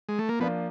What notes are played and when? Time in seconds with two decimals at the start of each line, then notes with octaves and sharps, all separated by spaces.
0.09 G#3
0.19 A3
0.29 A#3
0.40 F3 A#3 B3 D4 F4